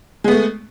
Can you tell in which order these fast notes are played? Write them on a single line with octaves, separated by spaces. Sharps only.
G#3 B3 A3